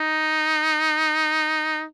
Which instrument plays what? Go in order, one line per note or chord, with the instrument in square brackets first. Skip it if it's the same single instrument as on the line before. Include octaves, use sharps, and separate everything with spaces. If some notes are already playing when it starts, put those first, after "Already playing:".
Already playing: [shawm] D#4